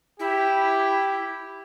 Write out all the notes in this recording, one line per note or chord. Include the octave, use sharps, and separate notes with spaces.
E4 G4